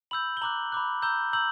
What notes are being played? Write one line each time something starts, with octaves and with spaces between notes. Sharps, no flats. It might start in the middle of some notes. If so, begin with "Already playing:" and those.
B5 E6 G6 F#7
G7
A#5 D6 F#6 F#7
B5 D6 F#6
A#5 E6 G6 G7
A#5 E6 G6 F#7